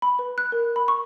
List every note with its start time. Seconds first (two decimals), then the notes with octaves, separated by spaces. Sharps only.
0.02 B5
0.19 B4
0.38 F#6
0.52 A#4
0.76 B5
0.88 C#6